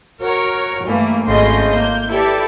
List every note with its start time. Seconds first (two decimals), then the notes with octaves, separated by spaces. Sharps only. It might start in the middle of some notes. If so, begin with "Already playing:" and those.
0.22 F#4 A#4 C#5
0.85 G2 E3 A3 A#3
1.25 G#1 A2 C#3 D#5 C6 G6
1.75 A#3 G6
2.11 E4 G4 A4 B4 D5